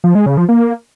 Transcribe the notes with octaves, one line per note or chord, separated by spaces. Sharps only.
F3
G#3
C#3
F3
A#3